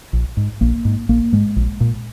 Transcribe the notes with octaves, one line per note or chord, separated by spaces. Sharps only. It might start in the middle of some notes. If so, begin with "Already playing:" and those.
A#1
G#2
A#1 A#3
G#2
A#1 A#3
G#2 G#3
A#1
A#2